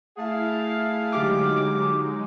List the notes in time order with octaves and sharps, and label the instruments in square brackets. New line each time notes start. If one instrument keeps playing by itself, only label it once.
[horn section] A3 G#4 F5 [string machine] E4
[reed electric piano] D3 G4 F6 [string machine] F#3 G#3 D#4 [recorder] D6